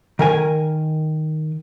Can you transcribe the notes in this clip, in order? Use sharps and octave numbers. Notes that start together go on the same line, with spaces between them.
D#3 A#4 G#5